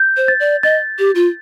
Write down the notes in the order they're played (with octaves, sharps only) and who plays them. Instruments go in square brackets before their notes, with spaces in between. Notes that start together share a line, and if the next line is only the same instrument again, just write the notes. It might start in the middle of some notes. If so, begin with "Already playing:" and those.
Already playing: [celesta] G6
[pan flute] C5
[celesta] A6
[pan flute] D5
[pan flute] D#5 [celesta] A6
[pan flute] G4
F4